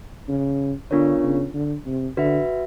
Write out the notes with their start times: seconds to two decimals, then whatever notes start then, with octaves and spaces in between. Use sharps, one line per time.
0.29 C#3
0.91 D3 B3 D4 F4 A#4 C#5
1.23 C#3
1.54 D3
1.86 C3
2.17 D3 F#4 B4 E5